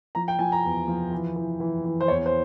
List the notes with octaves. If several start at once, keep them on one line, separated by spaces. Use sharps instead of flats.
F3 A#5
G5
F3 G#5
A#5
E2
F3
E3
E3
E3
E3
C5
E2 C#5
C5